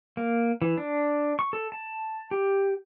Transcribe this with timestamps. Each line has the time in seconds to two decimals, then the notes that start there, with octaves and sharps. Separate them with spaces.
0.17 A#3
0.62 E3
0.78 D4
1.39 C#6
1.53 A4
1.72 A5
2.31 G4